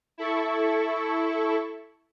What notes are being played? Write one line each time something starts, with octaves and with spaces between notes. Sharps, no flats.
E4 A4 C#6